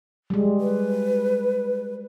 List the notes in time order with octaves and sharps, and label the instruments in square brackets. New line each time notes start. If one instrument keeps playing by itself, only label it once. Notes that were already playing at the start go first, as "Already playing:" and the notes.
[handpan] G3 G#3
[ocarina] B4